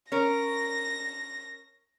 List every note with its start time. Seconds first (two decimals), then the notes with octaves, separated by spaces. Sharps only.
0.12 C#4 A#4 A#6